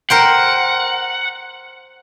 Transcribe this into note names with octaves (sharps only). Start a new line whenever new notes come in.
A#4 C5 F#5 G5